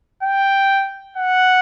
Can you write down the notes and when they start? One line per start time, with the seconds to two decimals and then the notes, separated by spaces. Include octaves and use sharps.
0.23 G5
1.17 F#5